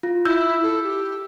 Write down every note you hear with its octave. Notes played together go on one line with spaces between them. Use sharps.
F4
E4 E6 G6
A4
G4